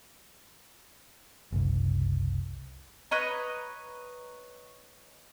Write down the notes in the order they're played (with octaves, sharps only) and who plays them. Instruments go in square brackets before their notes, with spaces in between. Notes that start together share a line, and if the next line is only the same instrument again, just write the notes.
[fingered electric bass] F#1 C2
[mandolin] B4 C#5 D#5 A#5